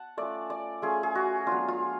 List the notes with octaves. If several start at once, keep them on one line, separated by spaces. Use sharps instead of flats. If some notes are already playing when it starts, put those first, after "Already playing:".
Already playing: F#5 A5
A3 C#4 F4 D5
D5
A3 C#4 F4 G#4
G#4
F#4
F#3 B3 D4 F4
F4